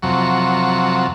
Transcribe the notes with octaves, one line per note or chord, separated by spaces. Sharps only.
F2 C3 F#3 C#6